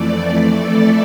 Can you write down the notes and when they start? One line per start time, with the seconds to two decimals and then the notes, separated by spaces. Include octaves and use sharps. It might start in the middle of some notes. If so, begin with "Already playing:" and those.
Already playing: F2 E3 A3 D5
0.53 A4